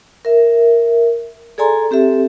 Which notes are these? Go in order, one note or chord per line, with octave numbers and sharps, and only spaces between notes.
A#4 E5
G#4 A4 D5 G#5 A#5 C6
C4 G4 A4 E5